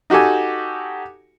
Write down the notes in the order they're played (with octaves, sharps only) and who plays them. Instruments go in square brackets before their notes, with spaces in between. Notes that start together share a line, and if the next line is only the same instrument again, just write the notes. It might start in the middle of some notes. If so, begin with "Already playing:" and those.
[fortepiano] D#4 F#4 G4 A4 G#5